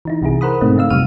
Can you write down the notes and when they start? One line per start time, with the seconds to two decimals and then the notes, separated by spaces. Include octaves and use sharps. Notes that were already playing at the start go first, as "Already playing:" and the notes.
0.05 E3 D#4 E4
0.22 C2 C3 E3 E4 G#4
0.41 A#4 C5 F#5 B5 D#6
0.61 G#2 B2 A3 C4 D#4
0.76 C#3 A3 D#4 F5 E6
0.90 F#2 C3 F3 G3 F6 D#7